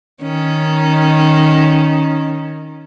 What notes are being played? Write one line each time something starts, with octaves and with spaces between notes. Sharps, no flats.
D#3 C#4